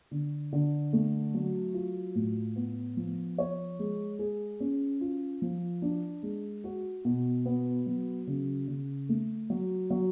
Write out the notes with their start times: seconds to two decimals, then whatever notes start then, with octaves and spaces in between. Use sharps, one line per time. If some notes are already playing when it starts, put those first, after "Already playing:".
0.11 D3
0.53 D3
0.93 A3
1.34 F#3
1.74 F4
2.15 A2
2.56 B3
2.97 F3
3.38 C#5
3.79 G#3
4.19 G#4
4.60 C#4
5.01 F4
5.42 F3
5.82 D4
6.23 G#3
6.64 F#4
7.05 B2
7.46 B3
7.86 F#3
8.27 C#3
8.68 C#3
9.09 A3
9.50 F#3
9.90 F#3